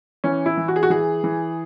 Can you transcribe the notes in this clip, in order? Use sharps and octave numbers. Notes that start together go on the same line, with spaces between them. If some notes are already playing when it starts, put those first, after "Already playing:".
E3 C#4
E4
E3
F#4
G#4
F#4
E3 G#4
E3